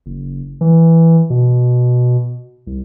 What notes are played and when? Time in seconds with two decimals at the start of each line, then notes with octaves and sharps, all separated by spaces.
0.06 F#1
0.61 E3
1.30 B2
2.67 C2